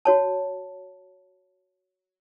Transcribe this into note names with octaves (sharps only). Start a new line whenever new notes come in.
F#4 C#5 A5